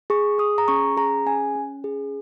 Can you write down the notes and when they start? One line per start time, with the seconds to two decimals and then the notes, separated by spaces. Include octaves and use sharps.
0.10 G#4 C#6
0.39 G#4 D#6
0.58 A#5
0.68 C#4 C#6
0.97 G#4 A#5
1.26 C#4 G#5
1.55 C#4
1.84 G#4